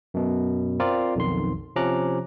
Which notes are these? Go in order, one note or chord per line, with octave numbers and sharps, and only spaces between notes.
F#2 B2
C4 F4 A#4 D5
B1 F2 D#3 C6
C3 F3 C#4 A#5 D6 F#6